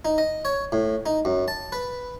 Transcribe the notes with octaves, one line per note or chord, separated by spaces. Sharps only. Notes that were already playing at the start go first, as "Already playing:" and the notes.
D#4
D#5
C#5
A2
D#4
F#2
A5
B4